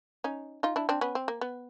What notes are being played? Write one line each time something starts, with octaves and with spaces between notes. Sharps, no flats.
C#4 D#4
D#4 F4
D4 E4
C4 D4
B3 C#4
C4
A#3
B3